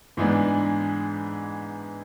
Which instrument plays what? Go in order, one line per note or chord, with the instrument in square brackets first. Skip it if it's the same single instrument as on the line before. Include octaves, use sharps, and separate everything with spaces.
[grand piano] G#2 E3 G#3 B3 D4